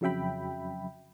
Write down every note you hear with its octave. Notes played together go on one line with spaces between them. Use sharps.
F2 C#3 F#3 E5 G5 B5